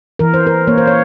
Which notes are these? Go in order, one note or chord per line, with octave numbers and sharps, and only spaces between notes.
E3 A#4
C5
A#4
A#3 C#5
C5
C#5